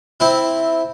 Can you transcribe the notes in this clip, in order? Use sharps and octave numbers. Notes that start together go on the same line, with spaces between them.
C4 E4